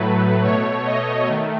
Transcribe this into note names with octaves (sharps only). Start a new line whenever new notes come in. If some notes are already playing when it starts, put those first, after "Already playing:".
Already playing: A2 F#3 A3 B4
B2 A3 C#5
D#5
D#3 A3